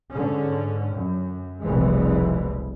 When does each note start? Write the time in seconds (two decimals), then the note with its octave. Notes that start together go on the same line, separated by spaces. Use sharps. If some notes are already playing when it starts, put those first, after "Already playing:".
0.11 G#2 D3 C#4
0.92 F#2
1.62 F1 C2 B2 E3 G#3